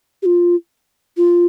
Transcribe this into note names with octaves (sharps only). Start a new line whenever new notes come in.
G4
F4
F4